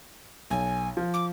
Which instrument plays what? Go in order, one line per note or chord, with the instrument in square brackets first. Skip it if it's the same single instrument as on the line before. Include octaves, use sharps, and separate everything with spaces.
[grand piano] B1 [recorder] G#5
[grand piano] F3
[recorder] D6